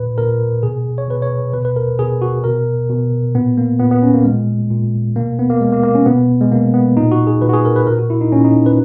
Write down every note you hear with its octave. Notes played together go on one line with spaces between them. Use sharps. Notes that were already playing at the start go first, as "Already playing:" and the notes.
Already playing: A#2 B4
A#2 A#4
B2 G#4
C#5
B2 B4
C#5
B2 B4
B4
A#4
B2 G#4
F#4
B2 A#4
B2
A#2 B3
A#3
A#2 B3
B3
C#4
A#3
A#2 G#3
A#2
B2 A#3
B3
A#3
B2 G#3
A#3
A#3
C#4
B2 B3
G#3
B2 A#3
B3
A#2 D#4
F#4
G#4
A#2 B4
F#4
G#4
A#4
B4
A#2 A#4
F#4
E4
D#4
A#2 C#4
D#4
B4